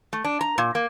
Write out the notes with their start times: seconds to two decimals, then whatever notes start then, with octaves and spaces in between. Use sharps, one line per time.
0.13 A3
0.24 D4
0.41 A#5
0.58 A#2
0.75 A#3